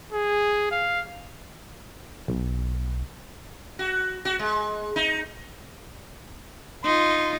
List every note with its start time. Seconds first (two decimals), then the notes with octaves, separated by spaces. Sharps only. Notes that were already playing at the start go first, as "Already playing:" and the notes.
0.13 G#4
0.71 F5
2.28 B1
3.79 F#4
4.25 F#4
4.39 G#3
4.96 D#4
6.84 D#4 F4 C6